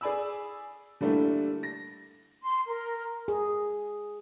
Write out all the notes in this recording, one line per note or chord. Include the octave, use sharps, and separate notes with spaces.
G#4 D5 G#5 B5 E6
D3 G3 A3 A#3 D4 E4
A#6
C6
A#4
G#4